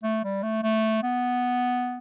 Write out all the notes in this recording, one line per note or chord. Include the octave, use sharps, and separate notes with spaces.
A3
G3
A3
A3
B3